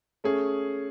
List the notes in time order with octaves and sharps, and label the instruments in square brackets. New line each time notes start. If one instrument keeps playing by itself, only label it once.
[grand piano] A3 C#4 G#4